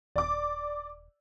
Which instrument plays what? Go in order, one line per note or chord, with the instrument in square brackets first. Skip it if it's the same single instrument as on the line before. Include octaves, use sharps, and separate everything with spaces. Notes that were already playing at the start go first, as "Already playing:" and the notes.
[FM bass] D#1 [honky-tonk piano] D5 D6